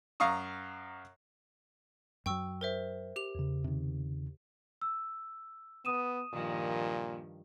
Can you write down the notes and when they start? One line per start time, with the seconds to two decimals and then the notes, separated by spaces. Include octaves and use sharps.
0.20 F#2 F5 A#5 C#6 D#6
2.26 F#2 F#3 G5 C#6 E6
2.61 A#4 C5 E5
3.16 G4 F7
3.35 E2 C#3
3.64 C3 D#3
4.82 E6
5.85 B3 D#6 D#7 E7
6.33 G2 A#2 D#3 F3